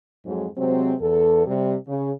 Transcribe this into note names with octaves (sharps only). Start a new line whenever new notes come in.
F2 G#2 F#3
C3 F#3 G#3 C4
E2 A4
C3 G3
C#3